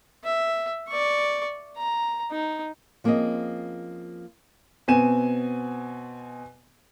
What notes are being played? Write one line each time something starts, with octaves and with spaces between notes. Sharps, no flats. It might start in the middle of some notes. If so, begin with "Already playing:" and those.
E5
D5 C#6
A#5
D#4
F3 A#3 C4 C#4 G#4 D#5
B2 B3 C4 G#5 D#7 E7